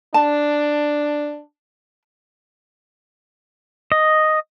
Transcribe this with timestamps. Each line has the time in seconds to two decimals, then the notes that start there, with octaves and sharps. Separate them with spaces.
0.14 D4 A5
3.92 D#5